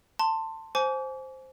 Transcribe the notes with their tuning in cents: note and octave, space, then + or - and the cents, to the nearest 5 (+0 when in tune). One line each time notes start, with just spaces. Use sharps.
A5 +20 C6 +0
C5 +0 G#5 +30 D6 -40